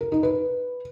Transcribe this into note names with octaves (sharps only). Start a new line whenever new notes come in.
A#4
D#4
B4